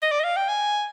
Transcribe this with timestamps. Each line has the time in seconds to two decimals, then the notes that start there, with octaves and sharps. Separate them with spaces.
0.03 D#5
0.12 D5
0.20 D#5
0.24 F5
0.37 G5
0.49 G#5